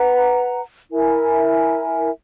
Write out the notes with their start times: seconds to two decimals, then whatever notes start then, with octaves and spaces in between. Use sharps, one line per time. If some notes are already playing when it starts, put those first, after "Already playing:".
Already playing: B4 F#5 A#5
0.91 E4 A#4 E5 G#5